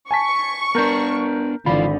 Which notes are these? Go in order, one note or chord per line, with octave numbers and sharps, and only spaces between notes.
G#5 A5 C#6 B6
B3 D4 A#4 A#5 G6
G#1 D3 E3 F4 B5